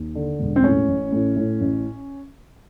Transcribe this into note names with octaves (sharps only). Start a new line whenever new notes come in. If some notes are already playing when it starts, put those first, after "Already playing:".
Already playing: D#2
D3
E1
C4
A2 C#4
A1
A2
A2
A1